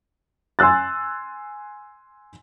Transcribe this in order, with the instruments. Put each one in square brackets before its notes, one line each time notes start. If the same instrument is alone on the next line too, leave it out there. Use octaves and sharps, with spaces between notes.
[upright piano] G#5 C6 E6 F#6 A6